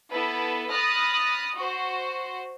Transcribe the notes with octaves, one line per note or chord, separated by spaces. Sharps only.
B3 E4 A4 B4
B5 D#6 F6 F#6 A6 A#6
F#4 C5